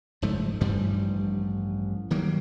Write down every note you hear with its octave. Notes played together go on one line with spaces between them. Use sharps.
F#1 G#2 F3 A3
A1 G2 F3 G3
D#3 F#3 G3 A#3